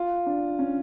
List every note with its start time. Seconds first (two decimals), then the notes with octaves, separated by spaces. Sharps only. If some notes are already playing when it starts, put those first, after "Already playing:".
Already playing: F4
0.26 D4
0.59 C#4